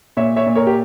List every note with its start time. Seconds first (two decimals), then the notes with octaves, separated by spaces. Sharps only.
0.17 A#2 C#5 E5
0.36 C#5 E5
0.46 A#2
0.55 A#4 C#5
0.67 G4